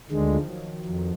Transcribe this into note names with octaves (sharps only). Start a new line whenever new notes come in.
D2 D3 D#3 G#3
F3
F#3
F2